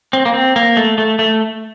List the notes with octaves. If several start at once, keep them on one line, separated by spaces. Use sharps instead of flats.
C4
A#3
C4
A#3
A3
A3
A3